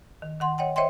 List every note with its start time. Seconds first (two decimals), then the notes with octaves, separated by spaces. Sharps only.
0.22 D#3
0.41 D#3 F#5 C6
0.58 C#5 D#5 F#5 G5
0.76 C5 C#5 D#5 E5 G5 C6